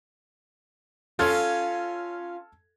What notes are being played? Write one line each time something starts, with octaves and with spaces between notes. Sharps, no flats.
C#4 F4 A4 F6 G#6